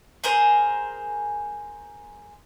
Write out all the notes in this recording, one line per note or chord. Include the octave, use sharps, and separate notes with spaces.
G#4 A#4 C5